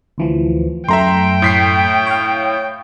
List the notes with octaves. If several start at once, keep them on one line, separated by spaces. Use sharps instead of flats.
D2 E3 F3
F#2 A3 E5 G5 A#5 C6
A2 B6 C7
C#5 F5